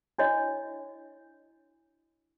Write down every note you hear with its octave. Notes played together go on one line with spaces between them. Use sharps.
D4 E4 F#4 C#5 D#5